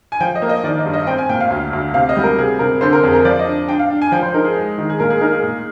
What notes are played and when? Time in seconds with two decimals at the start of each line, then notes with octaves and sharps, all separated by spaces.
0.12 G#5
0.20 F3 G5
0.35 D#5
0.42 A#3
0.49 D#5
0.64 D#3 D5
0.79 D#5
0.86 G2
0.93 D#5
1.07 C4 G5
1.18 G#5
1.29 A#2 G5
1.40 F5
1.50 D2
1.73 D2
1.94 C3 F5
2.09 D#5
2.17 G3
2.23 A#4
2.38 C3 G#4
2.59 C3 A#4
2.81 D3 C5
2.93 A#4
3.03 F2 G#4
3.14 A#4
3.25 F3 D5
3.39 D#5
3.46 D4
3.68 D4 G5
3.79 F5
3.90 D4
4.02 G#5
4.12 F3 G5
4.23 C5
4.34 D#4 A#4
4.44 G#4
4.56 G#3
4.78 D#3
4.90 G#4
5.00 A#2 A#4
5.10 G#4
5.21 D#4 A#4
5.32 G#4
5.43 A#2